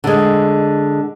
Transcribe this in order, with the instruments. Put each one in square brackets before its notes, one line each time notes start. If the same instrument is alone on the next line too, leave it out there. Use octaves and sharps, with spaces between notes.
[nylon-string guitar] D3 G#3